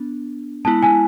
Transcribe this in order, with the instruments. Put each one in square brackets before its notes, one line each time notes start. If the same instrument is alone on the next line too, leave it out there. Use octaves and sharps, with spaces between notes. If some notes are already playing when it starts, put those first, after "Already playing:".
Already playing: [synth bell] B3 D4
[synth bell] G#3 B3 E4 [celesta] A5
[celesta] G#5